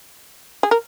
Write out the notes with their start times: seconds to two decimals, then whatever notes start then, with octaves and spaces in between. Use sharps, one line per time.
0.63 G#4
0.71 A#4